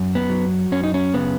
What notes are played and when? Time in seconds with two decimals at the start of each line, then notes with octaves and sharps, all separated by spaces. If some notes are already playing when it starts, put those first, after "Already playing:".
Already playing: F#2
0.15 B3
0.30 F#3
0.72 F#2 C#4
0.84 D#4
0.94 C#4
1.14 C#3 B3